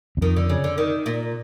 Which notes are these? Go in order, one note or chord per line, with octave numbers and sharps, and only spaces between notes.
E2
F2 D#3
D3
C#3
D3
D#3
A#2